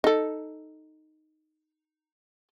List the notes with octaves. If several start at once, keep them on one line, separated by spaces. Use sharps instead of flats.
D#4 A4